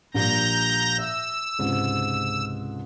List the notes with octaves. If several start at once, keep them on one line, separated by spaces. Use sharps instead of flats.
A#1 G3 A#3 A#5 G6 A#6
E5 E6
C#2 G#2 C3